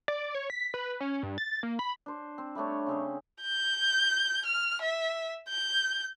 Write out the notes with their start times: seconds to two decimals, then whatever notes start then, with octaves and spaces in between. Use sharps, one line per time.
0.08 D5
0.35 C#5
0.50 B6
0.74 B4
1.01 C#4
1.23 G2
1.38 A6
1.63 A#3
1.79 B5
2.06 D4 C5
2.38 C4
2.55 G3 A3 D4 C#5
2.87 C#3 C4 G#4
3.42 G6
4.46 F6
4.82 E5
5.49 G6